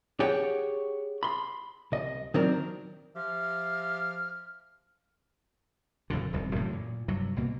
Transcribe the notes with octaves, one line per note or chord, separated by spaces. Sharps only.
G4 G#4 C#5 F#5 G5
B5 C6
C2 D#5
D#3 F#3 C4 D4 A#4
F3 G4 E5 F5 F6
F#1 F2 A#2 D3
E1 C2 G#2 B2
F#2 A2 C#3 E3
A#2
G2 C3 F#3
C2 B2 A#3